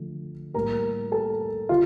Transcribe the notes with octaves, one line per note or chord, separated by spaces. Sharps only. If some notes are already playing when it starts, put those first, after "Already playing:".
Already playing: D3 F3 A3
A2 G3 A#3 A#4 A#5
A4 A5
D3 F4 F5